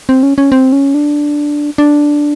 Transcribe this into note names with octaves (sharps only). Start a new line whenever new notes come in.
C4
C#4
C#4
C4
C#4
D4
D4